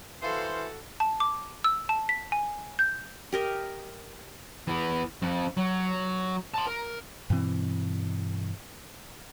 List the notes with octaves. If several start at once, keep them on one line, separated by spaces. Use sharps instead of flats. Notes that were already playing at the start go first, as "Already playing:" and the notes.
E3 F#4 A4 C5 F5 C6
A5
D6
E6
A5
B6
G#5
G6
G4 A#4 D#5
E3 B3
F2
F#3
A5 C6
A#4
G2 B2 E3 C4